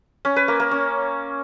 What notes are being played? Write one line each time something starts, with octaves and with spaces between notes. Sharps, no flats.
C#4
B4
A#3
A#3
C#4